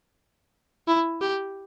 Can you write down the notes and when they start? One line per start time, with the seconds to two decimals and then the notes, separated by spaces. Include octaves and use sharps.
0.87 E4
1.21 G4